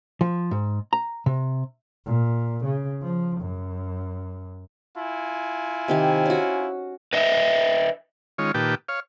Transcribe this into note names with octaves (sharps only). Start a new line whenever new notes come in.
F3
G#2
A#5
C3
A#2
C#3
F3
F#2
E4 F4 G#5
C3 D#3 G4
C#4 F#4
B4 D#5 E5
D#3 G#3 C#4 F4 C#5
A#2 D#3 G4 B4 G5 A5
C#5 F5